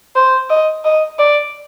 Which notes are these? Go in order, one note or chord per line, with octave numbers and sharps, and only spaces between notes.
C5
D#5
D#5
D5